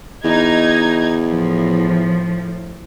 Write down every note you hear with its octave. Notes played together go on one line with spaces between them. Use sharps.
E2 D#4 G#6
A2 F3